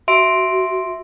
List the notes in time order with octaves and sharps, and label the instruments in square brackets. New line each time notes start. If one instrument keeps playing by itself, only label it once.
[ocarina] F#4 [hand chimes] E5 C6 D7